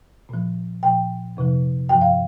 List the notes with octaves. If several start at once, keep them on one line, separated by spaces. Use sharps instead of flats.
A#2 F3
A#2 F3 G5
F2 C3 F3
G2 F3 G5
F5